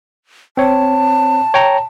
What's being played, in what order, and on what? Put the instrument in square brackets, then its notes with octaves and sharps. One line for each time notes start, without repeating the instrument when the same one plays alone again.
[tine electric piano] C4 C#5 [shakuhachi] A5
[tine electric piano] C#5 G5 A#5